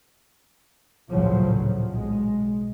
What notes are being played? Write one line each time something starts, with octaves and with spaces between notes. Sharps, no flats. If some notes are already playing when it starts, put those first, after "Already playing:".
A1 D2 A#2 C#3 F3 F#3
B1 G#3